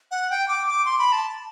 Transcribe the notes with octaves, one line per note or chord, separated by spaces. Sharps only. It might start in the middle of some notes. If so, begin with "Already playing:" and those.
F#5
G5
D6
D6
C6
B5
A5